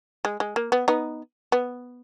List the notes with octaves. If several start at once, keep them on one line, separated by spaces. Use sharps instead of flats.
G#3
G#3
A#3
B3
B3 D#4
B3